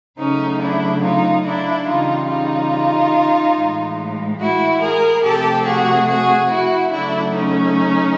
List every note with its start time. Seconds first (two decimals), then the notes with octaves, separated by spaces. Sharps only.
0.18 C#3 F#3 A3 C#4 D#4
0.60 D4 E4
1.03 D#4 F4
1.45 D4 E4
1.87 C#3 E3 G3 D#4 F4
2.29 D#4 F4
3.56 A2 E3 G#3
4.40 E4 F#4
4.81 G#4 A#4
5.23 C3 F3 A3 G4 A4
5.65 F#4 G#4
6.07 F#4 G#4
6.50 E4 F#4
6.92 C#3 F#3 A3 D4 E4
7.34 C#4 D#4